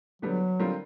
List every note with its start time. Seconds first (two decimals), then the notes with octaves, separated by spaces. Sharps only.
0.22 D3 F#3 G3 B3
0.60 D3 G3 C4 F4 A#4